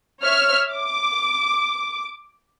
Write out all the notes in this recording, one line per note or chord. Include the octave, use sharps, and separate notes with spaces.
C#5 E5 F6
D6